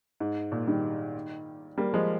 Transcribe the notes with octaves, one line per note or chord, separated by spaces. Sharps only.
G#2
A#2
D#3 G3
G3 A#3
F3 G#3